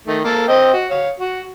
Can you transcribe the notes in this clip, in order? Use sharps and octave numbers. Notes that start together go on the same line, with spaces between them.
D#3 A3
A#3 A4
C4 D#5 G5
F#4
C#5 F5
F#4